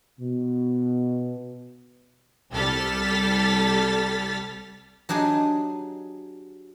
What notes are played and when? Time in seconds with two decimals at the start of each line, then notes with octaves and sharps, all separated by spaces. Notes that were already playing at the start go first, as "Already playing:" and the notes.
0.19 B2
2.52 C2 G3 A4 F6 A6 B6
5.09 F#3 D4 D#4 G4 G#4